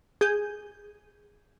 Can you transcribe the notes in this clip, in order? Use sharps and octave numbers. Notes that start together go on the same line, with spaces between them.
G#4 G6